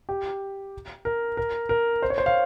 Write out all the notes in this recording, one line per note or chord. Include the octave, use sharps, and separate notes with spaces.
G4
A#4
A#4
A#4
C5
C#5
C5
F5